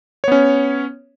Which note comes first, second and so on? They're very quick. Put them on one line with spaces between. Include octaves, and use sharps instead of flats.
C#5 B3 C#4